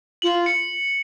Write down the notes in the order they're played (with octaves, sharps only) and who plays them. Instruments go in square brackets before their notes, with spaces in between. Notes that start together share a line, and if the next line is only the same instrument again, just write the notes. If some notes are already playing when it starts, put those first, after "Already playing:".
[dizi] F4 [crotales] F#7
[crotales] C#7